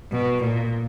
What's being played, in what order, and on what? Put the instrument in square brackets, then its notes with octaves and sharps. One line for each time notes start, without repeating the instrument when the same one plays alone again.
[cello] B2
A#2